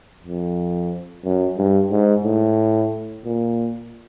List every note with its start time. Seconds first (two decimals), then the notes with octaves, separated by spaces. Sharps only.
0.24 F2
1.24 F#2
1.57 G2
1.91 G#2
2.25 A2
3.25 A#2